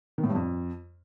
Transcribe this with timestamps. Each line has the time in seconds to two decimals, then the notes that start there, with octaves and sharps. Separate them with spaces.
0.18 D#3
0.24 A2
0.29 G2
0.35 F2